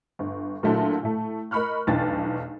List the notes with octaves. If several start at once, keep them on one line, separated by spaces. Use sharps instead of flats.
G1
A#2 D3 F#3 A3 E4
A2 A3
A#4 D#5 B5 C#6 F6 F#6
F1 B1 E2 D4 G5 A6